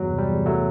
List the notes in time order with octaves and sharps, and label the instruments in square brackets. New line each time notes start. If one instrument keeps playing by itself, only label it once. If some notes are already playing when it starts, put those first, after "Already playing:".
Already playing: [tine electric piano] E2 G2 F#3
C3
G3
E2
A2 F#3 A3